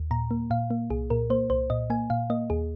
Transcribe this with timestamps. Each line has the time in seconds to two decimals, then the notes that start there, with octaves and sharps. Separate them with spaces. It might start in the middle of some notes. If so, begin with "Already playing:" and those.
Already playing: D#2
0.11 A#2 A#5
0.31 A#3
0.50 A#2 F5
0.70 A#3
0.90 C2 G#4
1.10 A#2 A#4
1.30 A#3 C5
1.50 C2 C5
1.70 A#2 D#5
1.90 A#3 G#5
2.10 A#2 F5
2.30 A#3 D#5
2.50 D#2 G#4